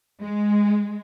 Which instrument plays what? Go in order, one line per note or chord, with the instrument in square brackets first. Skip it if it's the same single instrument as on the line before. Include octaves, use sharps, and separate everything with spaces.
[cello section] G#3